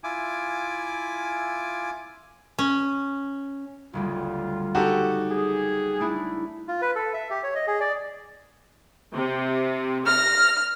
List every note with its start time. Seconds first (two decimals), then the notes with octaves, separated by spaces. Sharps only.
0.04 E4 F4 G#5 D6
2.59 C#4
3.93 F#1 D2 G3 F4
4.75 D#4 F#4 G4 A4
5.30 G#4
6.00 A3 D4 E4
6.68 F4
6.82 B4
6.95 A4
7.14 E5
7.30 G4
7.43 C#5
7.55 D#5
7.67 G#4
7.80 D5
9.14 C3
10.07 F6 A#6